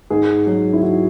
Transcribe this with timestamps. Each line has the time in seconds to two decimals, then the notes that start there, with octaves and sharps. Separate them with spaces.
0.10 G#2 G#4
0.47 F#3
0.73 E4
0.82 G#2 F#4